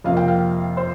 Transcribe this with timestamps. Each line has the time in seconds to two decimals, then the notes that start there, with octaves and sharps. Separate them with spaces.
0.04 F2 C3 A#3 F5
0.17 G5
0.28 F5
0.77 C5